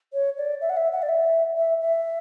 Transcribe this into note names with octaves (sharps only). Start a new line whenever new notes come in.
C#5
D5
E5
F#5
E5
F#5
D5
E5
E5
E5